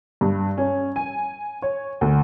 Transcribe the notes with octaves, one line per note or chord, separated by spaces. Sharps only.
G2
C#4
G#5
C#5
D2